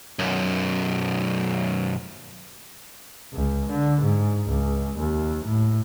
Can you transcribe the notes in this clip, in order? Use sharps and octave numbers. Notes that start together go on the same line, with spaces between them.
B1 F#2
C#2
D3
G#2
C#2
D#2
A2